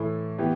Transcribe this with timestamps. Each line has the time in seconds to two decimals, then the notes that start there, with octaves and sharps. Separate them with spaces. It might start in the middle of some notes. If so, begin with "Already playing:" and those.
Already playing: A2 E3 A3
0.38 E3 B3 G4